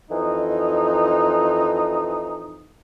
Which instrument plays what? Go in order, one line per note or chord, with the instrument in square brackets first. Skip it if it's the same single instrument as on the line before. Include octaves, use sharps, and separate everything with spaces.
[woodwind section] F2 E3 D#4